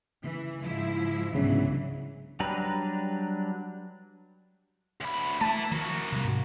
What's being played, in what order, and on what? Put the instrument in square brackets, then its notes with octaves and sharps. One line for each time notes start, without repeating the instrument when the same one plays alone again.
[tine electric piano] C#3 [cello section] E3
[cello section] G#2 F3 E4
[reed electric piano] C2 C#3 [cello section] G#2 E3 F#3 [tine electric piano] B3 D4 E5
[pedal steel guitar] F#3 G3 D4 B4 A#5
[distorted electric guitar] D2 B5
[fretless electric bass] A3 [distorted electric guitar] E4 B4 [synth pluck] A5
[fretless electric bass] D#3 F3 [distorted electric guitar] A#3 F#4
[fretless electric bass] C3 G3
G#2 C3